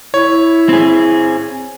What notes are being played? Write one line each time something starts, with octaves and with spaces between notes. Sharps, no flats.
E4 C#5
C4 G#4